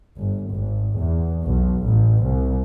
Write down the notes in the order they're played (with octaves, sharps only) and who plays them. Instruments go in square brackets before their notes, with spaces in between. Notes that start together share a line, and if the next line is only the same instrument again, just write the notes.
[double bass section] G1
G#1
E2
B1
A1
C2